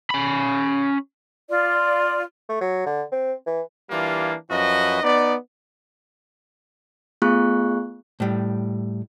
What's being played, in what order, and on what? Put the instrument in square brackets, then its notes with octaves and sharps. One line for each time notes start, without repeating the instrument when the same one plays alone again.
[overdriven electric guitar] C#4 B5
[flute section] F4 D5
[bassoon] A3
F#3
D3
C4
E3
[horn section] E3 G3 A#3 D4 F4
F#2 F3 F#4 B4 D#5
B3 D#4 D5
[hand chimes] A3 B3 F4 G#4 C#6 F#6
[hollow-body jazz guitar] A2 G3